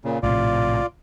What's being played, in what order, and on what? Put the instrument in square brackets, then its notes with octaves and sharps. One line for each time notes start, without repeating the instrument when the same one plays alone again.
[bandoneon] A#2 C#3
[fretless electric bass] A#1 A2 C3 [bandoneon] F4 D5